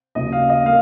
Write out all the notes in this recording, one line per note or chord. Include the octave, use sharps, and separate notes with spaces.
D#2 C#3 F#3 D#5
F5
D#5
A#3 F5